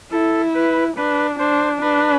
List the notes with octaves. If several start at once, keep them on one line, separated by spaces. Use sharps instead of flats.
E4 A4
B4
D4 B4
D4 C5
D4 B4